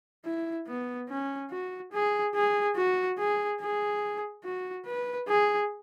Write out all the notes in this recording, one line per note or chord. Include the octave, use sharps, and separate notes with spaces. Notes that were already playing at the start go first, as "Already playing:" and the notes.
E4
B3
C#4
F#4
G#4
G#4
F#4
G#4
G#4
F#4
B4
G#4